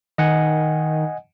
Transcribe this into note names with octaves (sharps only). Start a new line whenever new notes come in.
D#3 D#5 F#5 G#5